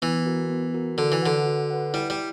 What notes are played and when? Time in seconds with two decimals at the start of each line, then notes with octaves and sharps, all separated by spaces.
0.02 E3 B3
0.26 F#4 A#4
0.50 B3
0.74 F#4 A#4
0.98 D3 F#4
1.12 E3
1.22 D3 B4 F#5
1.46 F#4
1.70 B4 F#5
1.94 G3 E4
2.10 G3